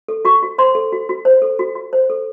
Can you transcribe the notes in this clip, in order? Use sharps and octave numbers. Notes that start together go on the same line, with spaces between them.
A4
F#4 C#6
F#4
C5 C6
A4
F#4
F#4
C5
A4
F#4
F#4
C5
A4